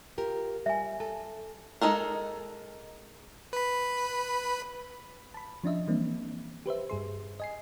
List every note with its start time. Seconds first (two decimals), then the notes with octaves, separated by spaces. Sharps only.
0.18 F4 G4 A#4
0.66 G3 E5 G#5
1.00 A4 A5
1.81 G#3 A3 D#4 A4 A#4
3.53 B4 B5
5.34 A5 B5
5.64 F3 C#4 D4 D#5 E5
5.87 E3 G3 A#3 C4 D4
6.66 G4 B4 C5 E5
6.90 G2 G#4 C6
7.40 D#5 G#5 C7